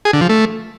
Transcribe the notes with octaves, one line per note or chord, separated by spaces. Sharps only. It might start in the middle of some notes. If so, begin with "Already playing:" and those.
G#4
D3
F3
A3